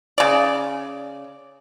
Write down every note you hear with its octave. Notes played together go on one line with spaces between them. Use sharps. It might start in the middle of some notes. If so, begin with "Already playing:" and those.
C#3 D5